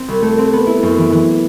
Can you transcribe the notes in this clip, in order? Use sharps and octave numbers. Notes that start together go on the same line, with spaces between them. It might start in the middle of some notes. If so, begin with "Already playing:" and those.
Already playing: C4
C2
A3
C4
B3
E4
F#2
E3
E3